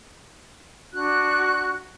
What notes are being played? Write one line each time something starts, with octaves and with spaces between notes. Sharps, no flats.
D4 F#4 F#6